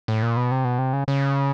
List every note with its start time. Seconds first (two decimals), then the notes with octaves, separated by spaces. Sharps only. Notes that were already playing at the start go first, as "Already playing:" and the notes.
0.08 A2
0.22 A#2
0.37 B2
0.51 C3
0.64 B2
0.78 C3
0.93 C#3
1.08 C#3